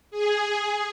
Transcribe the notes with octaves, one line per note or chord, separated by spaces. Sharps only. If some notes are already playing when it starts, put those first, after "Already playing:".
G#4